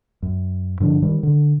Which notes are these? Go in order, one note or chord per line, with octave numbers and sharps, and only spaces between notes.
F#2
G2 D3 F3 D4
D#3 G3
D3